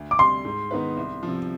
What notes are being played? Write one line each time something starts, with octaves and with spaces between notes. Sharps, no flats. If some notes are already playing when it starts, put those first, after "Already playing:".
Already playing: D2
D6
C3 G3 C6
G#2
D#3 B3 D#4 B4
C2
C3 F3